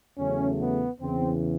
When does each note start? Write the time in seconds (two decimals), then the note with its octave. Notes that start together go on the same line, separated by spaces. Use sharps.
0.18 E2 C#3 F#3 A3 C#4
0.60 B3
1.01 E2 C#3 E3 C4